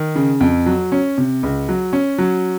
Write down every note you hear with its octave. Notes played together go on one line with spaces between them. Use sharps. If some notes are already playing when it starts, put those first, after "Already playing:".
Already playing: D#3
C#3
F2
F#3
C#4
C3
C#2
F#3
C#4
F#3